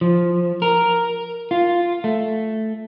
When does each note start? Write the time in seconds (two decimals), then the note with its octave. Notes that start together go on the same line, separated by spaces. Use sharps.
0.01 F3
0.62 A#4
1.51 F4
2.04 A3